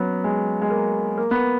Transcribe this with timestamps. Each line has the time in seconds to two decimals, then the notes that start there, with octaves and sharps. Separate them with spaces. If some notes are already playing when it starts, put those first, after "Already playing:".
Already playing: F#3 B3 C#4
0.24 G#3
0.61 G#3
0.70 A#3
1.18 A#3
1.31 B3